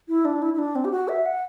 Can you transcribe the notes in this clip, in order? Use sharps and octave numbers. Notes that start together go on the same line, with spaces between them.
E4
D4
E4
E4
D4
C4
G4
F#4
E5
F#5